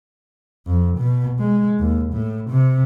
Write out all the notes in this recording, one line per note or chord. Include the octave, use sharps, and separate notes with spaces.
F2
B2
G#3
D#2
A2
C3